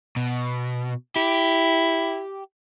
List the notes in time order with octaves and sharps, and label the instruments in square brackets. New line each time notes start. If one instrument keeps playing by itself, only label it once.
[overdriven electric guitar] B2
[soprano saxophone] E4 [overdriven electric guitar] G4